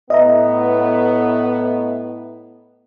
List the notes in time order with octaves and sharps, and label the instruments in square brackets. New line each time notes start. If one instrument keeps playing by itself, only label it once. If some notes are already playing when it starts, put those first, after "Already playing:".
[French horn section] A2 B3 [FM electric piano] D#5 E5 A#5